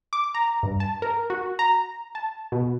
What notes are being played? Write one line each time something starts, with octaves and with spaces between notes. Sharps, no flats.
D6
A#5
G2
A5
A#4
F#4
A#5
A5
B2